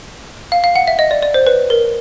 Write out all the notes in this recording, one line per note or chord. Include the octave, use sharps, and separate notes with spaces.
F5
F5
F#5
E5
D#5
D5
D5
C5
B4
A#4